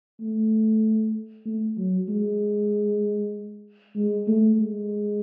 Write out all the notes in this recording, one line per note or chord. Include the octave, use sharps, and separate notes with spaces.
A3
A3
F#3
G#3
G#3
A3
G#3